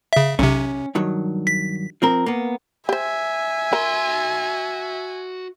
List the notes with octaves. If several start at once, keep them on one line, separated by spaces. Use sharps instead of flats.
C#3 E5
B1 C3 C#4
G2 D#3 F#3
B6
F3 C4 A#4
A#3 B3
G4 C5 E5 G#5
F#4 A#4 C6